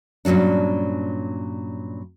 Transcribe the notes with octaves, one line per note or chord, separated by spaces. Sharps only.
G2 A#2 F#3 C#4 D4